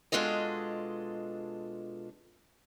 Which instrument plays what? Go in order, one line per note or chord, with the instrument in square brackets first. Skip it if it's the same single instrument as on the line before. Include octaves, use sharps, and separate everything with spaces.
[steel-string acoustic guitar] B2 G#3 D4 F4 A4 D#5